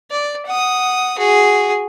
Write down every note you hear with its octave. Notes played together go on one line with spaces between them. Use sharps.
D5
F#5 D#6
F#4 G#4